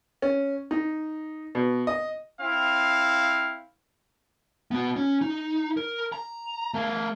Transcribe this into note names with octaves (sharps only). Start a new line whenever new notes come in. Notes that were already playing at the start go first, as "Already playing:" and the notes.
C#4
D#4
B2
D#5
C4 E4 F5
B3 F#4
C#4
D#4
A#4
A#5
A3 A#4